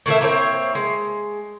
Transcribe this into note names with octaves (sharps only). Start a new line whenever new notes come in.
A2 D#3 A3 E5
A#3 C4 E4 C#5
G#3